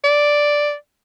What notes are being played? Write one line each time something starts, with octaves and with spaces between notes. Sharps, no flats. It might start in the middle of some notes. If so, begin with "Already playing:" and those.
D5